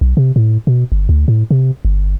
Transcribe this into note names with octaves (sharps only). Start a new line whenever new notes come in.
B1
C3
A2
B2
G1
D2
A2
C3
G1